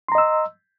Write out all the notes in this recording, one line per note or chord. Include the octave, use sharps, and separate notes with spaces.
D#5 A#5 C6 E6